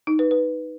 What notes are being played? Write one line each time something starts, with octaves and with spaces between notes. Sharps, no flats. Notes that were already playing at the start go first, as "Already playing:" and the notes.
D#4
B4
B4